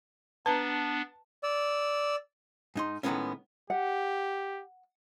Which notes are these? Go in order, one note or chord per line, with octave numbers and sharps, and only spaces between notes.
B3 D4 B4 A5 A#5
D5 E6
G#2 D#4 C6
A2 D#3 F#3 G#3 B3 C#4
G4 F#5